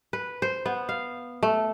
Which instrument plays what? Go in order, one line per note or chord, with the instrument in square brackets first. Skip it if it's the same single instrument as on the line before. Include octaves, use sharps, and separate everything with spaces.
[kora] B4
C5
B3
F5
A3